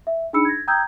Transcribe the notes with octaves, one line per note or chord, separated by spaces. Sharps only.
E5
D4 D#4 G#4 B5 E6 C#7
G#6 A#6
G5 A#5 D#6 E6 G6 G#6